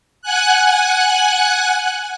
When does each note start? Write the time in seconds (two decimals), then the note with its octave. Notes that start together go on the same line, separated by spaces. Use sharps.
0.22 F#5 G#5 F#6